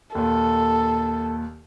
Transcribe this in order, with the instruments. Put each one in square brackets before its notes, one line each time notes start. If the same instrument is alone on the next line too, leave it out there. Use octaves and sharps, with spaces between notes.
[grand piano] D#2 A#2 [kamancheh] A4